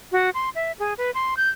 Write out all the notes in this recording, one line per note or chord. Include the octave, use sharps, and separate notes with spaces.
F#4
C6
E5
G#4
B4
C6
G6